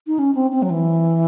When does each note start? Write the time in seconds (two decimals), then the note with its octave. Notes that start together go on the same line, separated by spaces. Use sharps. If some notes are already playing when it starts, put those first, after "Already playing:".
0.07 D#4
0.19 C#4
0.35 C4
0.52 C4
0.62 F#3
0.70 E3